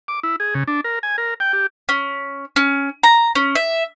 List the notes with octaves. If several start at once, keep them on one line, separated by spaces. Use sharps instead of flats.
D6
E4
G#4
C#3
D4
A#4
G#5
A#4
G5
G4
C#4
C#4
A#5
C#4
E5